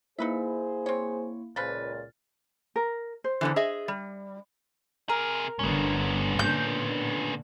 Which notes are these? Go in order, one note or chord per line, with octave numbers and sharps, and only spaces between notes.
A#3 D#4 E4 G#4 B4 C5 E5
C4 C#5
C#2 A#2 C#3 F3 B4 F6 A6
A#4
C5
E2 D3 E3
G#4 D#5 E5
G3
C3 G#4 A#4
G1 D3 B3 C#4
A#2 D3 G6